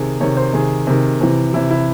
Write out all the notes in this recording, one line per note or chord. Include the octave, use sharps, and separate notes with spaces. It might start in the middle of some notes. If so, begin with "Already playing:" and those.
Already playing: C3 D#3 G#4
C3 D#3 C#5
C5
C3 D#3 G#4
C3 D#3
C3 E3
C3 E3 E4
E4